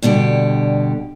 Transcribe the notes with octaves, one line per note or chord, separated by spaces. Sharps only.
G2 B2 D3 G4